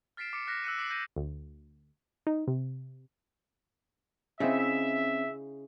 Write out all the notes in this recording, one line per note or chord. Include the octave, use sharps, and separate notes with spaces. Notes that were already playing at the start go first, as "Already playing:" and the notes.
F6 A6 B6 C7 D7 E7
D6 C#7
F6 F#6 A#6 B6
E6 F#6 C#7 D#7
D6 B6 C7 D7 F#7
G6 A#6 B6 D#7
D2
D#4
C3
C#3 C4 C#4 D#4 E4 E5